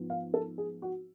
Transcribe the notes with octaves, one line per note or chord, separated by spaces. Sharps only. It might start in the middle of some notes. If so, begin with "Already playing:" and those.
Already playing: G#2 F3 B3
F5
A4
G#4
F#4